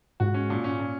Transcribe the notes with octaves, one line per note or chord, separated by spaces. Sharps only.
G#2 F#4
C#4
A#2
C#4
A#2